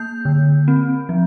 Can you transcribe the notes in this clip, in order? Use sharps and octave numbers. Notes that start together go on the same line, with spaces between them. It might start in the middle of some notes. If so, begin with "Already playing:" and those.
Already playing: A#3 G6
D3
C4
F3